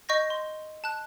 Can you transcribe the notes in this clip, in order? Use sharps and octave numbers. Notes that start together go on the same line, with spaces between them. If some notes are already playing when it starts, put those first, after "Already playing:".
D#5 C#6 G6 A#6
C6
A5 F#6